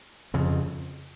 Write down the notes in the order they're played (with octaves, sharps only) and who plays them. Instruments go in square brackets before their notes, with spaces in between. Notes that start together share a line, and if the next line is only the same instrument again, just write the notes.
[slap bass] F2 C#3 F3